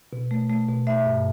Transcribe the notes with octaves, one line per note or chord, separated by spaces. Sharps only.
B2
A3
A3
B2
A3 E5
G2